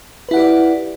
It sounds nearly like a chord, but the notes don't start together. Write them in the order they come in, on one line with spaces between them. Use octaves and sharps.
B4 E4 F#5 G4 D5